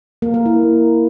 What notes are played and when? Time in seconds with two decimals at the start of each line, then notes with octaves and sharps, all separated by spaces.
0.22 A#3
0.34 A#4
0.46 E4